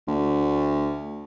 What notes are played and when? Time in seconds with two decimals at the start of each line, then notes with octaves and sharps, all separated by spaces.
0.07 D2